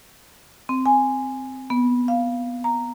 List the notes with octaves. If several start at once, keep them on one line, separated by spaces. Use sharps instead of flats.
C4
G#5
B3
F5
A#5